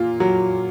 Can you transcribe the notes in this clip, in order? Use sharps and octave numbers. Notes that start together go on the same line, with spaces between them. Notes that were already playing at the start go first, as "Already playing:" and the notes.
Already playing: A#2 A#3 F4
F#3